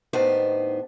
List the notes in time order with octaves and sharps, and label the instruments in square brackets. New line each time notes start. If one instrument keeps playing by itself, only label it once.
[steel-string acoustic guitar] D#2 A2 B3 D4 D#4 C5